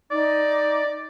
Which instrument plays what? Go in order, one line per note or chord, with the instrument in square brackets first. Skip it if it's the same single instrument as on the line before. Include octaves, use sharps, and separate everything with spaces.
[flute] D#4 [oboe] D5